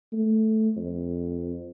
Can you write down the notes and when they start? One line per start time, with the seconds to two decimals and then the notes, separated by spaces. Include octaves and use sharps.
0.13 A3
0.76 F2